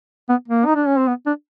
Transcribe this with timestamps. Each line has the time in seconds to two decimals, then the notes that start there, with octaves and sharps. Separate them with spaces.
0.29 B3
0.48 A#3
0.66 D#4
0.75 D4
0.87 C#4
0.97 C4
1.08 B3
1.26 D4